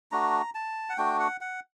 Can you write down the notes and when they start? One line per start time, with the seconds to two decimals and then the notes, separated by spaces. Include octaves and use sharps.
0.12 A3 D4 F#4 A#5
0.55 A5
0.89 F#5
0.98 A3 D4 F#4 G5
1.20 F#5
1.41 F#5